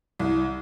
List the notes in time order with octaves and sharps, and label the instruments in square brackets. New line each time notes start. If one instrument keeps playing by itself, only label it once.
[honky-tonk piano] C2